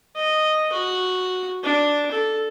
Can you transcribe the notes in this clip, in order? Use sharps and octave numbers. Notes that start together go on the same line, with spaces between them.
D#5
F#4
D4
A4